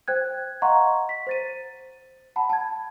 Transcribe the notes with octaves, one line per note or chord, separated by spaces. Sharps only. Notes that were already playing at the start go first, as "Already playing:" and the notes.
C5 G5 F#6 G#6
D#5 F5 F#5 A#5 C6 C#6
B6
C5 A6 D#7
F#5 A5 B5
A5 G#6